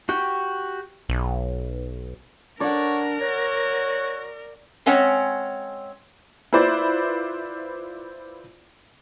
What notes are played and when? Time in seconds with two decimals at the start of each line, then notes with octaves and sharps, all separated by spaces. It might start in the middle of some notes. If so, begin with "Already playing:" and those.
0.09 F#4 G4 G5
1.09 B1
2.60 D4 A#4 C#5 D5 F#5
3.21 F#4 C#5
4.86 G#3 C4 C#4 C#5 F#5
6.53 E4 F4 B4 C5 D5